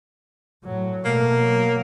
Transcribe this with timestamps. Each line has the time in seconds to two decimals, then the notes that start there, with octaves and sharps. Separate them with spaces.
0.64 A2 F#3
1.05 B2 A3 A#3
1.41 F#3